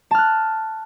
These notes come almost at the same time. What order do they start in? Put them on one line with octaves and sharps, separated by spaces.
A5 F6 F#6